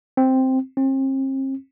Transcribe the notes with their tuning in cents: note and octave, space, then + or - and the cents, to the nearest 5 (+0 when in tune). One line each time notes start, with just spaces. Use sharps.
C4 +0
C4 +40